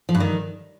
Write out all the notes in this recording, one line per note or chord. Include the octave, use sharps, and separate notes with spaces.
F3
G2
D#3